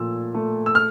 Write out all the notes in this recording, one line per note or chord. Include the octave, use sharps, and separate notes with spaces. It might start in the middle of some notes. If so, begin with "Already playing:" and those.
Already playing: A#2 F3 A3 E6
A3
E6
F6